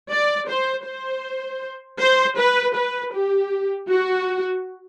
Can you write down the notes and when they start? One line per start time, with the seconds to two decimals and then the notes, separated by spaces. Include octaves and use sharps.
0.11 D5
0.49 C5
0.86 C5
2.00 C5
2.38 B4
2.75 B4
3.13 G4
3.89 F#4